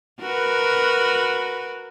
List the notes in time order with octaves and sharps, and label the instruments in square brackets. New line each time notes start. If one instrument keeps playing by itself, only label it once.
[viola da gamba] F#4 A#4 B4